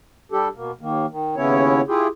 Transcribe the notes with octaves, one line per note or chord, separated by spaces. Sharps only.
G3 D4 G4 A4
B2 A#3
D#2 D#3 A#3
D#3
D#2 C#3 B3 C#4 E4 C#5
E4 F4 G4 G#4